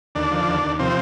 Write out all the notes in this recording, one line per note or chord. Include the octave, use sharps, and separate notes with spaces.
D#2 D3 D4
F3
D#2
D#2
C3 F3 C4